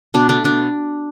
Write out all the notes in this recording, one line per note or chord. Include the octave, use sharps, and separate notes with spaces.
B2 D4
A3 D4
B2 D4